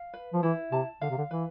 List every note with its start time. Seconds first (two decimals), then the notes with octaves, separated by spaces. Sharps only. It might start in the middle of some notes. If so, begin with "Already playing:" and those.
Already playing: F5
0.13 B4
0.33 F3
0.43 E3 E4
0.72 C3 A5
1.01 D3 F5
1.10 C3
1.18 D3
1.31 E3 B4